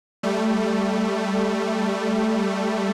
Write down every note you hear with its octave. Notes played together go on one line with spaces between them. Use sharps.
G3 A3